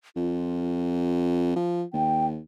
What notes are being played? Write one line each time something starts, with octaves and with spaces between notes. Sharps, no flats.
F2 F4
F3
D#2 G5